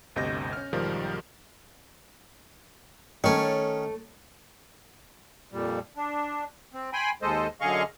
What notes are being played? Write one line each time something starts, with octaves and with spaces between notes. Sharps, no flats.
G1 D2 C3 D#5 G6 A#6
C#4 F6
B1 G#2 D#3 F3 G3
D#3 A3 C#4 C#5
F2 A#2 G3
D4
C4
G5 G#5 B5 C6
D#2 G#3 A4 C5 D#5
F#2 D3 G#4 D#5 F5 C#6